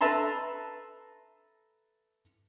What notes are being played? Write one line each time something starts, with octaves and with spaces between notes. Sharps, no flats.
A4 B4 E5 A5 A#5 C6